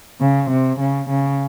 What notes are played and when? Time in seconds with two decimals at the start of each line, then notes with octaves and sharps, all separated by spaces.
0.21 C#3
0.51 C3
0.80 C#3
1.10 C#3